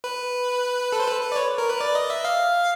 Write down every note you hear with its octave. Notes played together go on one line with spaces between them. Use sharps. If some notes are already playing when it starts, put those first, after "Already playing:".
B4
A4
C5
B4
B4
D5
C#5
A#4
B4
D5
D#5
E5
F5